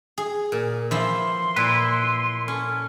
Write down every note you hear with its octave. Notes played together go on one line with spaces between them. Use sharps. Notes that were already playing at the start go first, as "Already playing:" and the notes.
G#4
A#2
E3 F3 E4 C6
A#2 E4 B4
C#4 A4